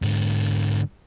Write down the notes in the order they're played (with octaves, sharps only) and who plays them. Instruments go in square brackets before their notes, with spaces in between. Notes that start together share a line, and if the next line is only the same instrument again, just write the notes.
[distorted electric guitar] G#2 D3